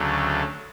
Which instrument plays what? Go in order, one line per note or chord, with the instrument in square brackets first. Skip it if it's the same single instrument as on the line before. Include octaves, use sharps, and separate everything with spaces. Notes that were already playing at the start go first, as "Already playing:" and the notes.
Already playing: [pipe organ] D2 C#3 F#3 A3